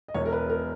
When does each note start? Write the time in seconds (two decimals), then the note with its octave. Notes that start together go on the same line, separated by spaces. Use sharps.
0.08 D#5
0.14 E1 E2 B2 C#5
0.26 A#4
0.33 B4
0.50 A#4